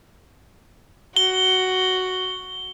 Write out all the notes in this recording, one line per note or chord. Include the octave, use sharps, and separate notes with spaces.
F#4 G7